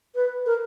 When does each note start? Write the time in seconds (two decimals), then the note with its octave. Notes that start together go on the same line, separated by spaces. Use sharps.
0.15 B4
0.46 A#4